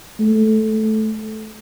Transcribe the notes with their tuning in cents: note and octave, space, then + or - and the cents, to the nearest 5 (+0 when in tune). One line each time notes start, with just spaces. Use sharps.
A3 -10